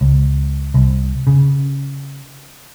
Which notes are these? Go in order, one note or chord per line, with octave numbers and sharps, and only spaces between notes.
C#2
C2
C#3